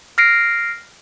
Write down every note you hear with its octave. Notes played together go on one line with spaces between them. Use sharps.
F6 A#6 C7 D7